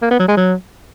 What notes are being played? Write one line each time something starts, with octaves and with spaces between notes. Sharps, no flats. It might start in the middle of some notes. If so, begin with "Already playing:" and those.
A#3
B3
F#3
G#3
F#3